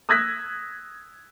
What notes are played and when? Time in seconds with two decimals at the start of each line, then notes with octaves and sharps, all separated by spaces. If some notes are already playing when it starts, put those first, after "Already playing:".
0.09 D#6 E6 F#6 G#6 A#6 B6